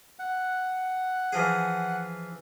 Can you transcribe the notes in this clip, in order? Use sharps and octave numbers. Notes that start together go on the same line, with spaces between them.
F#5
E3 F3 G#4